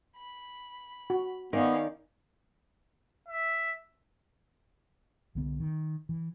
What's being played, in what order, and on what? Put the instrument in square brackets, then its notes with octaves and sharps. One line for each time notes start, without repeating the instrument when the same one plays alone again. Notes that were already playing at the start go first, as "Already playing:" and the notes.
[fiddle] B5
[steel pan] F#4
[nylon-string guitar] D#3 D#4 D5 [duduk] B3 [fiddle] C#4 F5
[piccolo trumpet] E5
[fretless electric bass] C2 D3 B3
D#3
E3